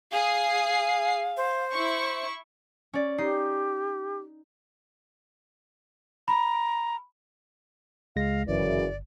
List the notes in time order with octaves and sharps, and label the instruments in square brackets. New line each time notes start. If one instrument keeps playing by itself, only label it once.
[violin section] G#4 C7 [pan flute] F5
[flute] C5
[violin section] E4 C#6
[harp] C#4 D5
[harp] D#4 C7 [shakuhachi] G4
[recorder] A#5 [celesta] B5
[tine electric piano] C#2 G#3 A#6 [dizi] F5
[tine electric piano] G1 [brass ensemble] F#2 C#3 E3 [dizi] D5